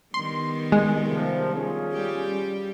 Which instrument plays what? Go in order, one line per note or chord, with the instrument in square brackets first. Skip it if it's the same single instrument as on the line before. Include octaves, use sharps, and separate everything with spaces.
[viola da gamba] D#3 G3 B3 [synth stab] C6
[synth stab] G#3
[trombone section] C3 F3
C#4 F4 G#4
[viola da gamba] G3 G4